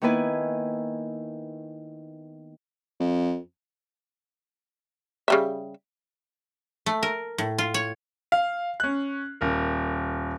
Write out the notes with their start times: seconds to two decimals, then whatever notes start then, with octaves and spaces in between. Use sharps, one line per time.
0.02 D#3 A#3 B3 E4 B4 G#5
3.00 F2
5.28 C#3 G3 E5
6.86 A3
7.03 A#4
7.38 A2
7.58 F4
7.74 C#5
8.32 F5
8.80 C#4 F#6
9.41 D#1 A#4